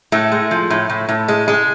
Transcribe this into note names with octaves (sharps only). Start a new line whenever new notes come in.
A2 A3
G#3
F3
A2
A2
A2
G#3
G#3